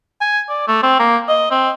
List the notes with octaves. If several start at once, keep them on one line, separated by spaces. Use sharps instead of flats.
G#5
D5
A3
C4
A#3
D#5
C4